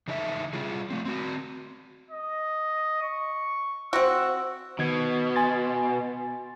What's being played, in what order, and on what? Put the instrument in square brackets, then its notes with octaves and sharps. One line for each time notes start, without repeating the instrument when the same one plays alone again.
[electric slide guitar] C#3 E3 D#4 A4 C#5 E5
G3 F4 G#4
A3 C4
C4 F#4
[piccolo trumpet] D#5
C#6
[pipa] C4 F#4 [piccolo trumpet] E6
[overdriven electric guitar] B2 [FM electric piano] D#3 G#6
[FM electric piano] G#5 C6 A6